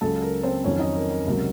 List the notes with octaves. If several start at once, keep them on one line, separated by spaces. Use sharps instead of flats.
C#2 C#3 F#3 A4 A5
A#4
C4 C5
F2 D#3 F#3 C#4 C#5
D#4 D#5
A#4
A#4
C#2 C3 F#3 A#4